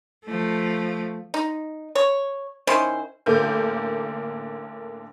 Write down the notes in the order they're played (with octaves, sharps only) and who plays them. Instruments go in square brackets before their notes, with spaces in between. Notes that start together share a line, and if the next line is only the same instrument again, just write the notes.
[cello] F3 A3
[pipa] D#4
C#5
D#3 C#4 E4 C5
[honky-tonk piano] A1 D3 A#3 G6